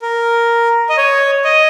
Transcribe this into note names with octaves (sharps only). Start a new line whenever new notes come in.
A#4
D#5
C#5
D#5